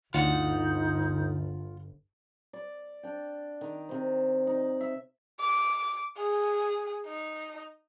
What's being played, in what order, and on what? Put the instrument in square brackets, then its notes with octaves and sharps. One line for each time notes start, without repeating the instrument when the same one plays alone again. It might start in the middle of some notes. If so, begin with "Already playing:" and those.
[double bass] G1 [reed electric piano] D2 D3 [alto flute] D#4 [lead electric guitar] F4 F#5
[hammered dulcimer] D5
D4 G5
D#3
C3 C5
D#4 D5
E5
[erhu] D6
G#4
D#4